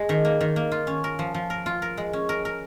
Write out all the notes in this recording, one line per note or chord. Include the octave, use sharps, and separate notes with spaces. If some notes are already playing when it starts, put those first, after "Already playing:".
Already playing: G#3
D#3
A#3
D#3
A#3
F4
C#4
A#4
F3
F3
A#4
F4
A#4
G#3
C#4
A#4
A#4